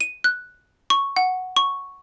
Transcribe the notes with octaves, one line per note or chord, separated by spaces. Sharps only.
D#7
F#6
C#6
F#5
C#6